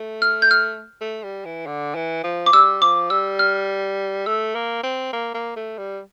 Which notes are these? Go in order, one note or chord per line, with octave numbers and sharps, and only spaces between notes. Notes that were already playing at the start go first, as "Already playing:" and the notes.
Already playing: A3
F6
G6
F6
A3
G3
E3
D3
E3
F3
D6
G3 E6
F3 D6
G3 E6
F6
A3 E6
A#3
C4
A#3
A#3
A3
G3